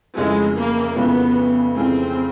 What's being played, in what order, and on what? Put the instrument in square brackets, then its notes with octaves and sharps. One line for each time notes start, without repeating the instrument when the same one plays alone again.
[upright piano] F2 C#3 E3 A3 [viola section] G#3
[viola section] A#3
[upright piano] F2 C#3 E3 A3 [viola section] B3
[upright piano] F2 C#3 E3 A3 [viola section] C4